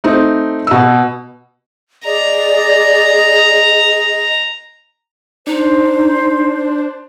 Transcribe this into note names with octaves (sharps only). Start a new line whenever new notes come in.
A3 C4 D#4
B2 E6
G#4 D5 D#5 A#5
D4 D#4 C5